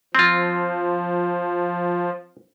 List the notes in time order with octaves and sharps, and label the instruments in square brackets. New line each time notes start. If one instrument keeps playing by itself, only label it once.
[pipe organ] F3 [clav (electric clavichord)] C4 F4